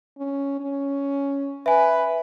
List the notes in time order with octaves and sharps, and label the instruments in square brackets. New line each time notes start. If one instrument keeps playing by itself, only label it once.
[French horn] C#4
C#4
[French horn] B4 [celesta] E5 G#5